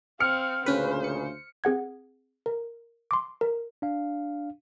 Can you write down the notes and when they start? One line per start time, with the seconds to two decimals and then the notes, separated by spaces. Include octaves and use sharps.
0.20 C4 F5 F6 C#7
0.66 D2 A#2 C#3 C#4 B4 C5
1.04 C#7
1.64 C4 G#4 F#5 G#6
2.46 A#4
3.11 C6 D6
3.41 A#4
3.82 D4 F5